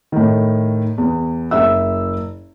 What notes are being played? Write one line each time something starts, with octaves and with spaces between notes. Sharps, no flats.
A2 D#3
E2
F#1 E5 E6